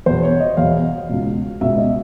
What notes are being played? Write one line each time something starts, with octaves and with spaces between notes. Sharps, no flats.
E2 B2 C5
C#5
D#5
E2 B2 F5
C#2 B2
C#2 B2 E5
D#5